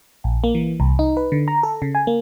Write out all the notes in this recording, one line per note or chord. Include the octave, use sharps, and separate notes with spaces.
A#1
A#3
E3
C2
D#4
B4
D3
A#5
A4
C#3
G#5
A#3